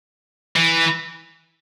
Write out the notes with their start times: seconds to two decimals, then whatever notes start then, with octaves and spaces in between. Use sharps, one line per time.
0.56 E3